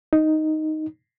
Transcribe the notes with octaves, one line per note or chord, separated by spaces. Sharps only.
D#4